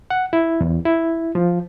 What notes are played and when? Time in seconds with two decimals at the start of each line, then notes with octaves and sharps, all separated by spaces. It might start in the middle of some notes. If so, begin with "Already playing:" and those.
0.10 F#5
0.33 E4
0.61 E2
0.85 E4
1.35 F3